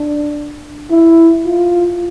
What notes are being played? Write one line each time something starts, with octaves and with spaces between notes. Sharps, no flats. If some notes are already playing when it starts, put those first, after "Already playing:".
Already playing: D4
E4
F4